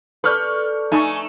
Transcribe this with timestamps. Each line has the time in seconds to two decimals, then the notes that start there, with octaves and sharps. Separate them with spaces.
0.24 A4 B4 D5 C#6 F6 G6
0.92 A3 D#4 G#5 C#6